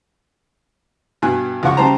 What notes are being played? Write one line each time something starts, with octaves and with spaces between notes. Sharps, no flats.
G2 B2 G#5 F#6
C#2 F3 F#5 C#6
C#3 G3 G4 C5 A5 A#5